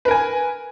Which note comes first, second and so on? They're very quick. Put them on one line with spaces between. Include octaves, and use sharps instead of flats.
B4 A#4 G#5